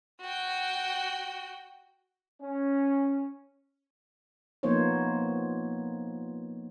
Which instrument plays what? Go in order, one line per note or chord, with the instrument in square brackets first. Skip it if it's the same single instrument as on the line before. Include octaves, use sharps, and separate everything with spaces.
[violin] F#4 G5
[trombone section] C#4
[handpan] F3 A#3 B3 D#4 C5 C#5